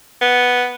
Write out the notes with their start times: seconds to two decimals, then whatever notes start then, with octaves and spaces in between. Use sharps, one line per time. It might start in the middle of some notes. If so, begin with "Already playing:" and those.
0.21 B3